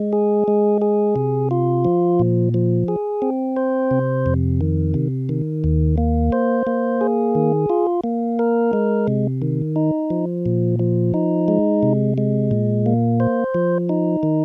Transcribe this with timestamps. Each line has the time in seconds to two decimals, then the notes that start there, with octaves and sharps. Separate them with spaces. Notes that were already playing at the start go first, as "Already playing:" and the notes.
Already playing: G#3
0.13 G#4
0.48 G#3
0.82 G#4
1.16 C3
1.51 F4
1.85 F3
2.19 A#2
2.54 F3
2.88 G#4
3.22 C4
3.56 C5
3.91 C3
4.26 F2
4.61 D#3
4.94 C3
5.29 D#3
5.64 D#2
5.98 A#3
6.32 C5
6.67 A#3
7.01 G#4
7.35 D#3
7.70 F4
8.04 A#3
8.39 A#4
8.73 G#3
9.08 C3
9.42 D#3
9.76 D#4
10.10 F3
10.46 A#2
10.79 F3
11.14 D#4
11.48 G#3
11.83 C3
12.18 G#3
12.51 A#2
12.86 A#3
13.20 C5
13.54 F3
13.89 D#4
14.23 D#3